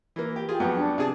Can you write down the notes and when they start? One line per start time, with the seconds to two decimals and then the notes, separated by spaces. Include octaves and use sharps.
0.16 E3 A#3
0.36 G4
0.49 F4 G4 G#4
0.60 F2 F#3 B3
0.76 D4
0.98 C3 G#4 A5